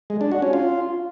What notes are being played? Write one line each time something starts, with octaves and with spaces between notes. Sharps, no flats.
G#3
D4
F#4
C#4
F4